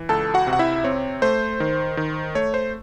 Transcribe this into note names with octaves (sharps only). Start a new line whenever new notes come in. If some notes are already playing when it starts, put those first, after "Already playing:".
Already playing: E3
C#2 A4 A5
F#4 F#5
C3
F#5
E4 E5
C4 C#5
A3 C5
D#3
D#3
A3 C#5
C5